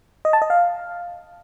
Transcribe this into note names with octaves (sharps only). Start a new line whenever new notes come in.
D#5
A5
D#5
F5